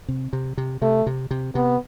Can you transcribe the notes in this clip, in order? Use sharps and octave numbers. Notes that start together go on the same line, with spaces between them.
C3
C3
C3
C3 A3
C3
C3
C3 B3